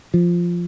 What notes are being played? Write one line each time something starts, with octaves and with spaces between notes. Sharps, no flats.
F3